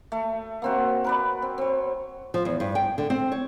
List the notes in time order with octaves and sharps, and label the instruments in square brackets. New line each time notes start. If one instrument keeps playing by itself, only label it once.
[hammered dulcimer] A3
A#3 C4 F#4
A#4 B4 D5
C4
C4 C#5
[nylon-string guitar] F3
E2
G2
G5
D3
C4
C#5